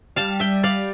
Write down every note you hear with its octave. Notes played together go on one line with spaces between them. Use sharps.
G3 F5 A5
E5 G5
D5 F5